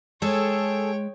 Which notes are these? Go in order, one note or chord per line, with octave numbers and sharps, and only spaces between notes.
G#3 G#4 A4 C#5 G5